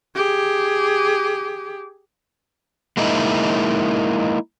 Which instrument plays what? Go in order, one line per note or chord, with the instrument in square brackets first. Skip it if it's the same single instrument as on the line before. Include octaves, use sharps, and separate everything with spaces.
[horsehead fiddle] G4 G#4
[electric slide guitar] G#3 A#3 D#4 E4